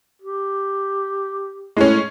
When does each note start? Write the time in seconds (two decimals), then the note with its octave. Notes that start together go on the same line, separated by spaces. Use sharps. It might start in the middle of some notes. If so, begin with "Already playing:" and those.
0.22 G4
1.77 A2 G#3 C#4